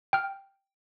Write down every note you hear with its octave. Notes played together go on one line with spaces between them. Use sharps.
G5 F6